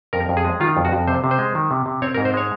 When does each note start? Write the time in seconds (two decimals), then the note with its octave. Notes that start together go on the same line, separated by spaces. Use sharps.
0.13 F2 A#4
0.29 F2
0.37 G#4
0.45 G#3
0.60 D#3 F4
0.77 F2
0.85 F#4
0.92 F2
1.08 C3 C5
1.24 C3
1.31 C5
1.39 G#3
1.55 D#3
1.71 C3
1.86 C3
2.02 C4 C#5
2.14 A#4
2.18 G#2
2.25 C5
2.34 G#3 C#5